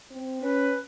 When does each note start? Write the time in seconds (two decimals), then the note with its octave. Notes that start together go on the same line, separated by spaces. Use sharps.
0.10 C4
0.42 C#4 B4